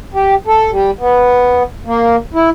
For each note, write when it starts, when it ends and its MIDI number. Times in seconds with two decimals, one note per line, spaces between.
0.14 0.35 67
0.47 0.71 69
0.71 0.91 55
0.99 1.63 59
1.86 2.16 58
2.34 2.49 64